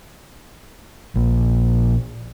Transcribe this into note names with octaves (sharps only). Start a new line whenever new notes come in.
A#1